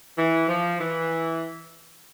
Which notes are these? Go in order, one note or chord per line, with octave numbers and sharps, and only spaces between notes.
E3
F3
E3